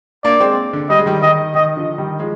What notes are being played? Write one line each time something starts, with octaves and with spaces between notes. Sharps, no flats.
A#3 D4 D5
G#3 C4
D3
G3 D#5
G#3
D#3 G3
D#3 D#5
D#3 D#5
D3 F3
D#3 G3
F3 G#3